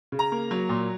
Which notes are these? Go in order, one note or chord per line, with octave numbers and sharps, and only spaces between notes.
C#3
A#5
A#3
F#3
A#2